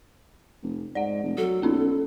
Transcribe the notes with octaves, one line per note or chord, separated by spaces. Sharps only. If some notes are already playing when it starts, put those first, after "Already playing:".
F1
G#2 D5 F#5
F1
F#3 A4
B1 A#3 C#4 D#4